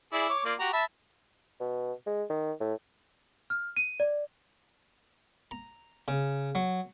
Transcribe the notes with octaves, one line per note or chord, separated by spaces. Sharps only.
E4 G#4 D5
C#5 D6
A#3 F4 D5
F#4 G4 A#5
E5 A5 B5
B2
G#3
D#3
A2
F6
D#7
D5
A#5
C#3
F#3